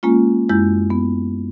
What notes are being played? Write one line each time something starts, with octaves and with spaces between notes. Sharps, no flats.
G#3 A#3 C#4 F4
F#2 G#3 E4 G6
B3